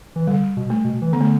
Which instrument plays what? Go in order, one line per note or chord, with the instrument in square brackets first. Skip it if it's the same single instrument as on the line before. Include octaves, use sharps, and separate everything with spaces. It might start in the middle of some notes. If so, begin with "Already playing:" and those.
[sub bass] E3
[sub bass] D3 [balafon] G3
[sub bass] B2
[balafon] A3
[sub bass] B2
E3
[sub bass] D3 [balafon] B3
[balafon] A3